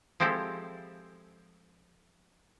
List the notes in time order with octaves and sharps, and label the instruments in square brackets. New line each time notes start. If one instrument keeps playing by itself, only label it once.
[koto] F3 G#3 C4 E4 G4 A4